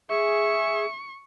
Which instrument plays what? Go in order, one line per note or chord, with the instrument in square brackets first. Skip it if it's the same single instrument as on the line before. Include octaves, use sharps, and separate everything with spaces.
[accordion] G#4 [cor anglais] E5 [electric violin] C#6